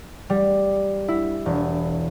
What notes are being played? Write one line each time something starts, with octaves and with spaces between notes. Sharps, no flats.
G3
E4
E1